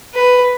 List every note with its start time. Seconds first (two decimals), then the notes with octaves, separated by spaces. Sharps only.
0.14 B4